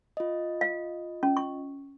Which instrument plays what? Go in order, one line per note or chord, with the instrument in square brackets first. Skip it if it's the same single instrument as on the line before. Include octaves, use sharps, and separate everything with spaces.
[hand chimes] F4 D#5
[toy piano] F5
C#4
C#6